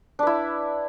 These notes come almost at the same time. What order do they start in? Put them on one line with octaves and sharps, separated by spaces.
D4 B4 E4